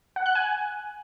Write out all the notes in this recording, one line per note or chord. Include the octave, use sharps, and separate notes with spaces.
F#5
F#6
G#5